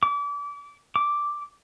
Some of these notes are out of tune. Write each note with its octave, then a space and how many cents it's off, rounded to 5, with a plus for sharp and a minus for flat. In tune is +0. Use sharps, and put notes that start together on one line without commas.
D6 -35
D6 +0